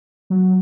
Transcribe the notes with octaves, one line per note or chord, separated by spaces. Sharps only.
F#3